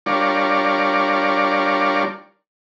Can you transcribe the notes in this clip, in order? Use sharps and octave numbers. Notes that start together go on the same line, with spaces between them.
G3 D4 F4 A#4 C#5 D5